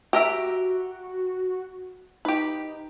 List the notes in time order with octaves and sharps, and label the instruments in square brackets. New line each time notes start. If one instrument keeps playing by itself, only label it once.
[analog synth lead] F#4 [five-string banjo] G4 A#4 E5
[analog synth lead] D#4 [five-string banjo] G4 B4